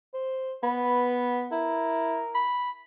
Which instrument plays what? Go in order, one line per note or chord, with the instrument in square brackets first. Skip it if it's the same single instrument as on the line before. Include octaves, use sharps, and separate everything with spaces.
[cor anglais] C5
[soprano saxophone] B3 [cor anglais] B4
[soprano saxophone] E4 [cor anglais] A#4
[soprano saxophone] B5